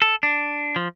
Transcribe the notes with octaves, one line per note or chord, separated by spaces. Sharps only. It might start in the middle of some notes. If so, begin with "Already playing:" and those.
A4
D4
F3